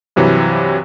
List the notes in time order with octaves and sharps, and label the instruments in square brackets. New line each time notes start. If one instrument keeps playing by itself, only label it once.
[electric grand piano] G2 C3 E3 F#3